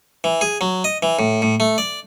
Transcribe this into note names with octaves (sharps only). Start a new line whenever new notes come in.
E3
G#4
F#3
D#5
E3
A2
A2
A3
D5